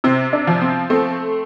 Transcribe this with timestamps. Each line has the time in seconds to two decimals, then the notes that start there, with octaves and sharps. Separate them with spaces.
0.04 C3 C4
0.33 D4
0.47 F3
0.62 C4
0.90 A3 C4